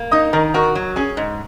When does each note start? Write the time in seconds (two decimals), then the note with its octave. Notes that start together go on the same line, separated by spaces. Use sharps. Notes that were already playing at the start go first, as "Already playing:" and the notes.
Already playing: A#3
0.11 D#4 D#5 D#6
0.33 D#3 A#4 A#5
0.54 F#4 A#4 A#5
0.75 F#3
0.96 C#4 G#4 G#5
1.17 G#2